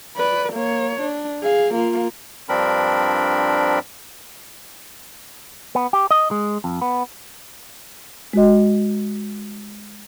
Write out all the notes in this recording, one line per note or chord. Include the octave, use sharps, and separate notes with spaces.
B4 D5
A#3 C#5
D4
G#4 F5
A#3 F4
G2 F3 C4 D4 A#4 B5
B3
G4
D#5
G#3
F2
B3
G#3 F#4 D#5